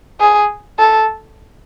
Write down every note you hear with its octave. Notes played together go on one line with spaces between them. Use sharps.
G#4
A4